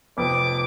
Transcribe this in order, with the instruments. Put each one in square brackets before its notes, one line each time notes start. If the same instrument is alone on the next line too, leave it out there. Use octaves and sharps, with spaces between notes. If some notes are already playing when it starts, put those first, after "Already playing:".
[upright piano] F1 F2 F3 B3 [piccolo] D6